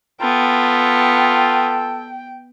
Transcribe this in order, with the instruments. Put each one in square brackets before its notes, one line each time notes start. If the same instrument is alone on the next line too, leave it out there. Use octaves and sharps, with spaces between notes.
[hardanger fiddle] B3 [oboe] F4 [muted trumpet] A4 [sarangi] G5